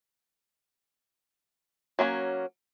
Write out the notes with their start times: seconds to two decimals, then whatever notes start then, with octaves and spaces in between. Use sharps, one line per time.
1.99 F#3 A#3 C4 C#4